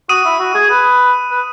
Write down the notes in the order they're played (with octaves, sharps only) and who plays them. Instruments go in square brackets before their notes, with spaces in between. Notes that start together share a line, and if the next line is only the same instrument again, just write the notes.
[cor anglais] F#4 [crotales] D#6 D#7
[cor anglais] E4
F#4
G#4
B4
B4